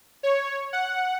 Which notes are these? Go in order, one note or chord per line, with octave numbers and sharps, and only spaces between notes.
C#5
F#5